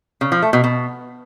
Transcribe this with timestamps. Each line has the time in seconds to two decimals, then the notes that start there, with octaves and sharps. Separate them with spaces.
0.21 C#3
0.32 F3
0.42 A3
0.53 B2
0.64 B2